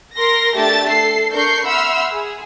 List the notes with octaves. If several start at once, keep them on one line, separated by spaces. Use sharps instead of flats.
A#4 C6 A#6
A3 D4 G4 E5 A5 A6
A4 C7
D4 A#4 C#6 G6 C7
E5 F#5 B5 C6 E6 F6
G#4